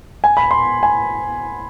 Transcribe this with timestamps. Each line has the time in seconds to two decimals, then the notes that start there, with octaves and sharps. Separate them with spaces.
0.24 G#5
0.37 B5
0.51 C6
0.83 G#5